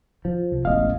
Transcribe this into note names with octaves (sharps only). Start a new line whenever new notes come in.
F3
C2
E1 A1 D#5 F5